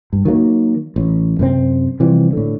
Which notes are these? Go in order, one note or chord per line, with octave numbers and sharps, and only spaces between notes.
G2
D#3 F#3 A3 A#3
A1
F#2 C3 C4
C3 E3 F3 G3
A2 D3